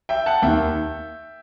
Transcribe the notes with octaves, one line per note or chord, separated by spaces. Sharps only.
E5 G5
F#5 A5
D#2 D#3 E5 G5